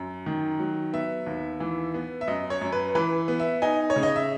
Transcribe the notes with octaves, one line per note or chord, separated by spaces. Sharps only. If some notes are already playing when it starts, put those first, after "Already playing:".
Already playing: F#2
D#3
F#3
B3 E5
D#2
E3
B3
E5
F#2 D#5
C#5
F#2
B4
E3 B4
B3
E5
D#4 G#5
C#5
C#3
D#5
E5